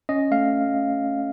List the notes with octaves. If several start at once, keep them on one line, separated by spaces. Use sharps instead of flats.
C#4 D#5
A3 F5